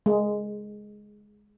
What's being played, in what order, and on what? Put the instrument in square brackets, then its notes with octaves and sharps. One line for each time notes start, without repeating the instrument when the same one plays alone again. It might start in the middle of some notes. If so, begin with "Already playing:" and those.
[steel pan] G#3